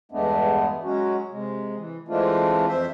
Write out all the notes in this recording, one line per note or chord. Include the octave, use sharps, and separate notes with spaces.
E2 G2 G#3 A3 B3 D4
F#3 G#3 C#4 F#4
C3 G#3
E3
E3 G#3 A3 C4 D4 F4
F2 C5 E5